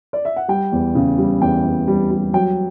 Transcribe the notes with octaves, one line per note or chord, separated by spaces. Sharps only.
D5
E5
F#5
G3 G5
E2
C#3
G3
E2 G5
E2
G3
G3
F#3 G5